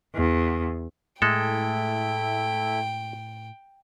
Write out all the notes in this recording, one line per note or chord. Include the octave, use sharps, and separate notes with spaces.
E2
A2 G#3 A3 E4 A4 G5